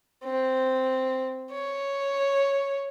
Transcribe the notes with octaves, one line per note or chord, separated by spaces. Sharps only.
C4
C#5